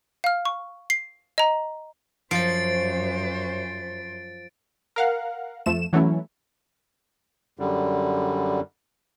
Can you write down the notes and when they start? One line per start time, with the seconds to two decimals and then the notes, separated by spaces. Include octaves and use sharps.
0.24 F5 F6
0.45 C#6
0.90 C7
1.38 D#5 A#5
2.31 F#2 F3 C5 A6 D7
4.96 A#4 F5 F#5
5.66 F2 F3 A3 E7
5.93 E3 F#3 A3 C#4 E4
7.59 F#2 D3 G3